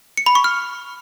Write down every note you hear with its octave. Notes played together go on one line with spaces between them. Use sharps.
C#7
B5
C#6
F6